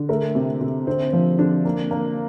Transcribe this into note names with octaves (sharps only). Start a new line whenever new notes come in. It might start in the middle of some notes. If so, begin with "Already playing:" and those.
Already playing: D3
A3 A#4
C3
C3
D3 C4
F3
D3 D4
A#3
A#3